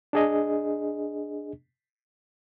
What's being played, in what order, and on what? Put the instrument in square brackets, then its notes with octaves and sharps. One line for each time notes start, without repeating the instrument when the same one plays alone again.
[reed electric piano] D4 G#4 D#5